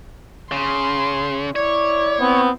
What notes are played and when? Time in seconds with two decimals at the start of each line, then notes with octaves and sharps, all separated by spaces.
0.52 C#3 C6
1.56 E4 C#5 D5
2.20 B3 C4